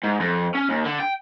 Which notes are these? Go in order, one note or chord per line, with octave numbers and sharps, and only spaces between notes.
G#2
F2
C#4
D#2
D3
G5